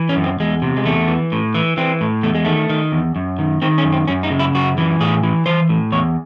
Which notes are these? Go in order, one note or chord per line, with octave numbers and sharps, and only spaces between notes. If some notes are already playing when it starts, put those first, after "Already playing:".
Already playing: E3
C#4
F#2
C4
E2 G#3
C3
G#3
E2 A3
E3
A2
E3
E3 C4
A2
E2 A3
G#3
D#3 A3
D#3
E2
F#2
D#3
D#3 C4
C#4
F#2
C4
F#2 C#4
D#4
C#3
E4
F#2 F#4
E3
A2 G#4
E3
E3 C5
A2
E2 C#5